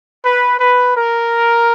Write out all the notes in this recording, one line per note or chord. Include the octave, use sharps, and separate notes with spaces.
B4
B4
A#4